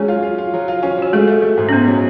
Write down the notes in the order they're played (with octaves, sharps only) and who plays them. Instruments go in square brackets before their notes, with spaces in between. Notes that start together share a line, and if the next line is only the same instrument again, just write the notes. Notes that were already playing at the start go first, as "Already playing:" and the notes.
Already playing: [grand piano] F#3 C#4 [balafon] G#3 G#4
[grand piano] F4
F4
F4
F#3
F4
C#4
[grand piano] C#4 [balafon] F#4
[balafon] G#3 G#4 [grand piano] A3
[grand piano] A3
A3
G#2
[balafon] C#4
[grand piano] G#2 [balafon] B3
[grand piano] F#3